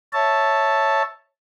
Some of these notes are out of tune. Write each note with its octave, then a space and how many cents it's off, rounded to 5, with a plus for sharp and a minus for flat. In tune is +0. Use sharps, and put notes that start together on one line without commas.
C#5 +0 E5 +0 A5 +0